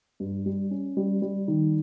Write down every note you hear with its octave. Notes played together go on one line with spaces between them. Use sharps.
G2
G3
C#4
G3
G3
D#3